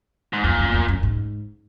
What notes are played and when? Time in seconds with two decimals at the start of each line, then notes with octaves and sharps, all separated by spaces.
0.33 G#2
0.44 F2 A#2
0.59 F#2
0.73 F2
0.88 F#2
1.03 G#2